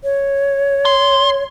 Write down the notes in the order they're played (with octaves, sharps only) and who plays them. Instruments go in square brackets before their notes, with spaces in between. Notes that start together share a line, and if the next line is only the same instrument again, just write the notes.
[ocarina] C#5
[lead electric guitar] C6